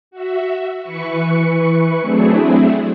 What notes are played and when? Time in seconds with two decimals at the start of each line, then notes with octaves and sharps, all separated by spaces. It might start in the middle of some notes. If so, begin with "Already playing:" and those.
0.11 F#4 E5
0.82 E3 B4 C#6 C#7
2.01 F#3 A3 C4 D4 E4 G#4